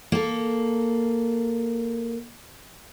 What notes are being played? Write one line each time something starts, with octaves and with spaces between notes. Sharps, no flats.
A#3 A4